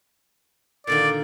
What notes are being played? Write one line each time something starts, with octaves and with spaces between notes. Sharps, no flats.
A#2 D3 D#3 D5